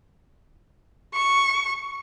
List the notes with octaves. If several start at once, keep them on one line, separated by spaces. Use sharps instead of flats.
C#6